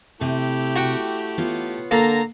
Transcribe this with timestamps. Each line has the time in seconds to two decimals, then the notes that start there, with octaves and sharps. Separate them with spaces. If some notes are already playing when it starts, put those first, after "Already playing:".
0.21 C3 A3 E4 G4
0.76 F#4 F#5 G5
1.38 B3 F4 C#5
1.91 D3 A#3 A4 A#5